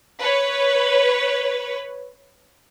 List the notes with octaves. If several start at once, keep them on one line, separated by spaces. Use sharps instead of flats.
B4 C#5